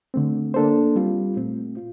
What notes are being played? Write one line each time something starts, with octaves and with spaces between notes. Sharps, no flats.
D3 A3 C4
A#3 D4 A4 C5
G3 C4 F4
A#2 A3 C4
F4